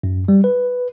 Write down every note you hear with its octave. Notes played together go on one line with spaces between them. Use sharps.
F#2
G3
B4